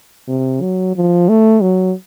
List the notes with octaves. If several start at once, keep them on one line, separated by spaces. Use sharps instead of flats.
C3
F#3
F3
A3
F#3